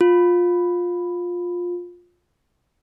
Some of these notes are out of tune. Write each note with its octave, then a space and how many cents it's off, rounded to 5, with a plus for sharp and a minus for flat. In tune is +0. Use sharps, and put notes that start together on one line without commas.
F4 +15